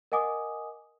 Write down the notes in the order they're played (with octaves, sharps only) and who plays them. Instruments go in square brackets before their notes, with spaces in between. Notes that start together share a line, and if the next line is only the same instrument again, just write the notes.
[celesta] A#4 D#5 F#5 G#5 D6 D#6